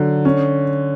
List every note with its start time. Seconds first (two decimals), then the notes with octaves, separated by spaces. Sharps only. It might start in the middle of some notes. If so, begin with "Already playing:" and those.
Already playing: D3 F#3
0.25 C#4